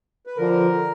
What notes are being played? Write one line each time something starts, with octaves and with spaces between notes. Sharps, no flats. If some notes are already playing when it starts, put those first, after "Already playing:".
B4
D3 F3 A#4